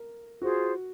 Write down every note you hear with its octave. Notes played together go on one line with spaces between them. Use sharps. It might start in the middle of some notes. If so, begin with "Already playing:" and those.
Already playing: A#4
F4 F#4 G#4 C5